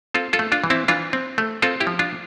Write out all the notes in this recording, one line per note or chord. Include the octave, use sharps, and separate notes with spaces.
C4 F4 A4
F4 A4
A3
D4 F4
E3
C4 E4
E3 D4 F4
C4
A3
C4 F4 A4
E4 G4
F3
D4 F4